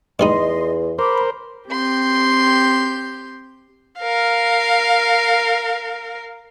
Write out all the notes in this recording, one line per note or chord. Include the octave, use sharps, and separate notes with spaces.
A1 E2 G3 D#4 D#5 C6
A#4 C5 B5 D6
C4 G4 C6 G6
A#4 F5